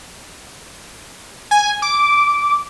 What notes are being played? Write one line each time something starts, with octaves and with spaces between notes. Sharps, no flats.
G#5
D6